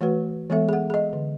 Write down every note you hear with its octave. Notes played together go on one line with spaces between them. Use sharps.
E3 A3 F#4 B4
E3 G#3 B3 A4 E5
G#4 F#5
G#4 D#5
D3